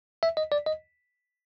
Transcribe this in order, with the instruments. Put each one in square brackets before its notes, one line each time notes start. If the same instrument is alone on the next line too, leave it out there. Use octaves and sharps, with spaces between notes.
[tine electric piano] E5
D#5
D5
D#5